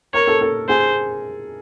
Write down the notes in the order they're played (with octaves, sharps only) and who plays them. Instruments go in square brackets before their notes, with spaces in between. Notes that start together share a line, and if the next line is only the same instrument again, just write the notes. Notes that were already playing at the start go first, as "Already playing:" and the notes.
[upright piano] A#4 [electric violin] C#5
[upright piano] A4
A4
[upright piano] G#4 [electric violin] C5